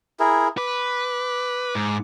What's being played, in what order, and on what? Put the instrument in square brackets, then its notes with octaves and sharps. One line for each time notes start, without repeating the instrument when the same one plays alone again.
[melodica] E4 G#4 A#4
[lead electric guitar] B4 [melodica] D6
[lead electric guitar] G#2